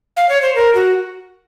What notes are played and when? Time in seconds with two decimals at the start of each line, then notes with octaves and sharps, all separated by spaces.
0.17 F5
0.29 C#5
0.42 C5
0.56 A#4
0.75 F#4